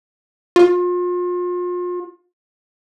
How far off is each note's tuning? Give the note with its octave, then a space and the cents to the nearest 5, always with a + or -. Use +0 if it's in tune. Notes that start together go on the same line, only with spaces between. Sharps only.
F4 +35